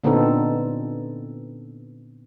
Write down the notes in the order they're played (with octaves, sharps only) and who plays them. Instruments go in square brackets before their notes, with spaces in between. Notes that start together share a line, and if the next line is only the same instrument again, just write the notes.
[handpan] A#2 D3 B3 C4 D#4 A4